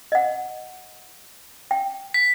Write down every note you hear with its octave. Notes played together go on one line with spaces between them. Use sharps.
D#5 F#5
G5
B6